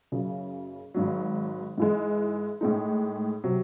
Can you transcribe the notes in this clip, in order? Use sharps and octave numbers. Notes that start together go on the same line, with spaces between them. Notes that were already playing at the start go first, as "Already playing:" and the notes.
F#1 F#2 C#3
G#1 G#2 F#3
G#2 E3 G#3
A2 G#3 D#4
C3 F#3